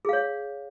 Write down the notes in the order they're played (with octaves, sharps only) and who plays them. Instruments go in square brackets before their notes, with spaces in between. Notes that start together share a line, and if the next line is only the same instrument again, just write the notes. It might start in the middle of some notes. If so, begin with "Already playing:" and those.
[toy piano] G#4
F5
C#5